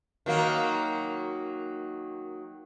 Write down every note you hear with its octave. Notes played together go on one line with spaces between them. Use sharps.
D#3 F#3 A#3